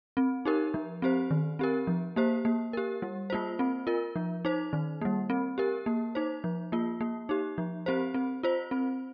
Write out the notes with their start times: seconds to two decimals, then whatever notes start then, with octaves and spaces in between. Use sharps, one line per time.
0.17 C4
0.45 D#4 G4 A#4
0.74 F3
1.02 C4 G4 C5
1.31 D#3
1.59 C4 G4 A#4
1.87 F3
2.16 A#3 G4 C5
2.45 A#3
2.73 G4 A#4
3.02 G3
3.30 A#3 F4 C5
3.59 C4
3.87 F4 A#4
4.16 F3
4.45 D#4 C5
4.73 D#3
5.01 G3 A#3
5.30 C4
5.58 G4 A#4
5.86 A#3
6.15 D#4 C5
6.44 F3
6.72 A#3 F4
7.01 A#3
7.29 D#4 G4
7.58 F3
7.86 C4 G4 C5
8.14 C4
8.43 F4 C5
8.71 C4